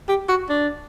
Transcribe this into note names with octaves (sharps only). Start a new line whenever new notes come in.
G4
F#4
D4